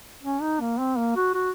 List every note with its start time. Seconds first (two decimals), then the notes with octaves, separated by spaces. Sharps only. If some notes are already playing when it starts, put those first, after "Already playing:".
0.23 C#4
0.42 D#4
0.61 A#3
0.78 C4
0.97 A#3
1.16 F#4
1.34 F#4